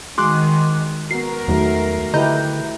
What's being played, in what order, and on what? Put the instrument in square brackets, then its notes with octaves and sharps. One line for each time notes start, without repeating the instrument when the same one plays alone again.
[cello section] D#3 [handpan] G#3 F#4 G#4 [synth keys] C6 D6 F#6
[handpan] B3 F#4 [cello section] A#4 [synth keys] C7
[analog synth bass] E2 [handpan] D#3 F#3 A3
[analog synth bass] D3 [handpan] E4 G4 B4 [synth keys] D#5 A#5 G6